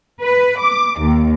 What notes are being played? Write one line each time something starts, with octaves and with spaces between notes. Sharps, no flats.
B4
D6
D#2